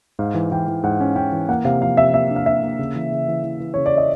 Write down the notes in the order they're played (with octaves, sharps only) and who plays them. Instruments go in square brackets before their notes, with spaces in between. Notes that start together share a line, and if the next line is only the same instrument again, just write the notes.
[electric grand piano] G#2 [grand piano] F5
[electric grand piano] E3
[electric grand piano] E3 [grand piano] G5
[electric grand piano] E3
[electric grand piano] G#2 [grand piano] F#5
[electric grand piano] C#4
[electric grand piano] C#4 [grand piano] G5
[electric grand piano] E3
[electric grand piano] A#3 [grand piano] F#5
[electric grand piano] C3 [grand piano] F5
[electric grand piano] F3 [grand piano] F5
[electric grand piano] C3 [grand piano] E5
[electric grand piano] A#3 [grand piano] E5
[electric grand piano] D4
[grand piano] F5
[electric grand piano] A#3 [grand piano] E5
[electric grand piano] A#3
C#3
E3
C#3
E3
E3
E3
[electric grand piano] C#3 [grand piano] C#5
[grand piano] D5
D#5